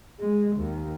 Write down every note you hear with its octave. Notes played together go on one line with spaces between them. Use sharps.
G#3
D#2